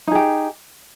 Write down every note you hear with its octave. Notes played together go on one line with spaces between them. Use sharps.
D#4 G4 G#4